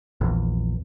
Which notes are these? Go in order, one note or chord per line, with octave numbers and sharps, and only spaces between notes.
A#1 E2